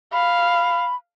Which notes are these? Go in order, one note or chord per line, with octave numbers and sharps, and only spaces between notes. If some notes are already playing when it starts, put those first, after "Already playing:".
F5 B5